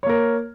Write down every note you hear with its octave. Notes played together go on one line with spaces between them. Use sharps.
A#3 A#4 C#5